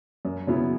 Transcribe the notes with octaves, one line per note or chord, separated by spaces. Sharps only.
F#2
C#3 F#3 B3 E4